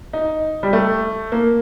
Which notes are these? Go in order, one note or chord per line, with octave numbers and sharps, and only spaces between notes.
D#4
G3
A3
A#3